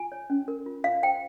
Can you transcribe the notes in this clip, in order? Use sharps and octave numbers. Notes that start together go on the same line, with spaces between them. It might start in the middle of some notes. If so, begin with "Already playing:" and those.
Already playing: F4 G#5
C#5
C#4
A#4
F4
F4 F5
C5 G5